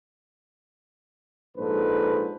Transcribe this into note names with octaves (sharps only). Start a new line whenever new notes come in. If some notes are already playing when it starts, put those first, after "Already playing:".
A#1 G#2 A4 B4 C5